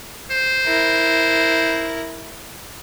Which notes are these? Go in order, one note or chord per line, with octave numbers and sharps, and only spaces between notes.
C5
E4 A#4